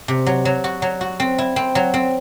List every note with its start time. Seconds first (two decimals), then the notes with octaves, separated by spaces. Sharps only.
0.08 C3
0.27 F#3
0.45 F#3
0.64 F#4
0.82 F#3
1.01 F#4
1.20 C4
1.38 E4
1.56 C4
1.75 F#3
1.94 C4